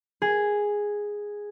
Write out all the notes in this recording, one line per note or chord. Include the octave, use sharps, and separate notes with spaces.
G#4